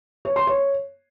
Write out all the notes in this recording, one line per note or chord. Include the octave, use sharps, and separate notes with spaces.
C#5
C6
C#5